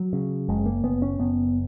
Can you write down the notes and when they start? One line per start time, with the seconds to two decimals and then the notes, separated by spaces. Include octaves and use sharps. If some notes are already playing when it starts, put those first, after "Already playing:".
Already playing: F#3
0.13 C#3
0.49 F#1 G#3
0.66 A#3
0.83 F#1 B3
1.02 C#4
1.19 F#1 B3